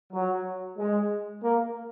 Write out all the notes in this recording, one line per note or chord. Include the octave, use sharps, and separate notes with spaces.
F#3
G#3
A#3